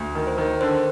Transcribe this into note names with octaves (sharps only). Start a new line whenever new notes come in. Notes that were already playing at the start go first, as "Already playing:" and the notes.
Already playing: D2
D#3
C5
D#3
D3 C5